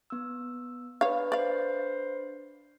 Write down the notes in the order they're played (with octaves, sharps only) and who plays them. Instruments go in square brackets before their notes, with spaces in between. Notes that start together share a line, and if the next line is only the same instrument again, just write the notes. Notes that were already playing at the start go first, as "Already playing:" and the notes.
[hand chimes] B3 E6
[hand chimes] D4 B4 [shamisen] C#5 F5
[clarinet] C5 [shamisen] D5 F5